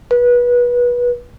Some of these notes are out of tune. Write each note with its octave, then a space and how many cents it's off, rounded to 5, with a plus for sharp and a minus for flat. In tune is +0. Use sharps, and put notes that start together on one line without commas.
B4 -25